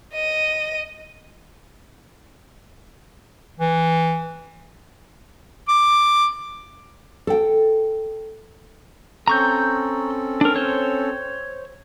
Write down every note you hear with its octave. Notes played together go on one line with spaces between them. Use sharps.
D#5 D#7
E3
D6
A4 G5
C4 C#4 A4 A#5 C#6 G6
D4 A#4
C5 C#5